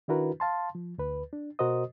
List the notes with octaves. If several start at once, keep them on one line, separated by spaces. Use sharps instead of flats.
D#3 D4 E4 F#4 A#4 B4
F5 A5 C6
F3
D2 B4
D4
B2 F#4 A#4 C5 D#5 D#6